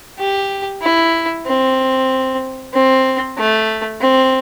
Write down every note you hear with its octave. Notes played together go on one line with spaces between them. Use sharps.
G4
E4
C4
C4
A3
C4